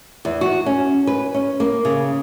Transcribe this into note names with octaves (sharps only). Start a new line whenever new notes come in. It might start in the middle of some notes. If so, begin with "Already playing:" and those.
E2
F#4
C#4
B4
C#4
A#3
C#3